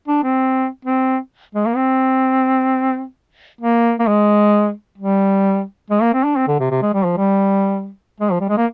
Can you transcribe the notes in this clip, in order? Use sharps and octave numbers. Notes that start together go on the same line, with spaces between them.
D4
C4
C4
G#3
A#3
C4
A#3
A#3
G#3
G3
G#3
A#3
C4
D4
C4
D3
C3
C3
G#3
G3
F3
G3
G#3
F3
G3
G#3
A#3